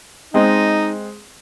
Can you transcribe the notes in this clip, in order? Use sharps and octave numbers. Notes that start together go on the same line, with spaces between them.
G#3 C4 D#4